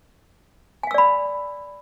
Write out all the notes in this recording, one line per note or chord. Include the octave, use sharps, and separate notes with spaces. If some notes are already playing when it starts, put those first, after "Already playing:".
D5 F5 G#5 B5 E6